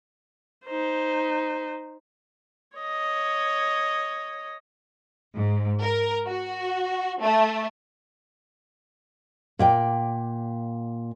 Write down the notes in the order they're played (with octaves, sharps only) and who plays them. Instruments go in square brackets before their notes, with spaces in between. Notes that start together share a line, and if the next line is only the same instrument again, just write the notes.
[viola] D#4 C5
C#5 D#5
[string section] G#2
A#4
F#4
A3
[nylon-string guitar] A#2 D5 G5